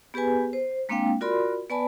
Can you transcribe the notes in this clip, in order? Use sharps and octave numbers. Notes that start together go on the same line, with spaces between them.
B3 G4 G#4 B4 G#5
C5
G#3 A#3 C4 D4 F5 G5
F4 F#4 A#4 D5 B5 C6
B3 B4 D5 G#5 A5 B5